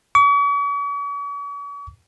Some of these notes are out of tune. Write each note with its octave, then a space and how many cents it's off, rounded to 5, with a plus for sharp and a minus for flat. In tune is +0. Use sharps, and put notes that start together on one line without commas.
C#6 +45